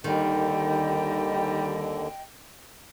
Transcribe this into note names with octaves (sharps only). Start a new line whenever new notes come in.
D#2 D3 D#3 G3 D#5 G5